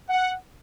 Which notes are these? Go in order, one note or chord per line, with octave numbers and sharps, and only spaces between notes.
F#5